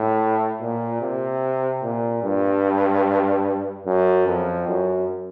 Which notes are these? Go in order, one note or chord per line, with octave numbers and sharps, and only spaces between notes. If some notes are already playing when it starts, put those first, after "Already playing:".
Already playing: A2
A#2
C3
A#2
G2
F#2
F2
F#2